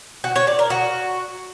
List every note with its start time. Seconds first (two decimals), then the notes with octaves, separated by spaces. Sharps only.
0.24 F#4
0.36 C#5
0.47 D5
0.59 A#4
0.70 F#4